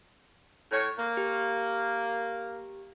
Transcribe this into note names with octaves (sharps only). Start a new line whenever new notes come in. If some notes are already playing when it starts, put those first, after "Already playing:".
A2 C#5
A#3
G4